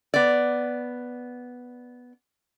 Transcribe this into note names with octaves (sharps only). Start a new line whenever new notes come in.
B3 D5